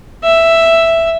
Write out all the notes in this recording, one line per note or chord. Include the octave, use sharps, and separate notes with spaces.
E5